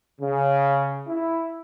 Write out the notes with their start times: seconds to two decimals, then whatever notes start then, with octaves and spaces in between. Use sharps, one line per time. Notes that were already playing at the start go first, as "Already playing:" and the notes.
0.20 C#3
1.08 E4